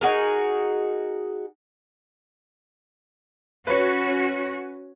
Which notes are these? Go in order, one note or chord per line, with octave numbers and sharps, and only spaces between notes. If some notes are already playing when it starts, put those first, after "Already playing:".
D#4 F#4 G#4 A#4
C#4 F#4 B4 C#5